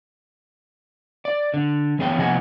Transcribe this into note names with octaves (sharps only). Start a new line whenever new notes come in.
D5
D3
E3 B3 G#4 C#5 G5
C3 F3 B3 D#5 F#5 G#5